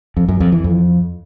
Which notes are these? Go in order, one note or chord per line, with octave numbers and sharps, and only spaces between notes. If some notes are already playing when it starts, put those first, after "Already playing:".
F2
F#2
F2
E3
F2